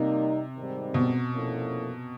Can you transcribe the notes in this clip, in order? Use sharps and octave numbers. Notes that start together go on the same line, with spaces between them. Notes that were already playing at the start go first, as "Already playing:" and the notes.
Already playing: C3 G3 A#3 D#4
G#2 D#3 G3 C4
B2
F3 A#3 C#4 E4 A4